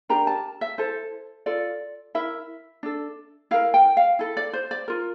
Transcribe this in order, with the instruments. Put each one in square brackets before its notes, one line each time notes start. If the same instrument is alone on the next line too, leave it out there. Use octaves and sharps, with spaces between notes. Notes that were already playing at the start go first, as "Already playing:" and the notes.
[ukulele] D4 G4 A#4 A#5
A5
E5
E4 A4 C5
F4 A4 D5
E4 A#4 E5
D4 A4
E4 A#4 F5
G5
F5
E4 A4
D5
C5
D5
F4 A#4